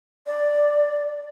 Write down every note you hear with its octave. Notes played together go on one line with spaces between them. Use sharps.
D5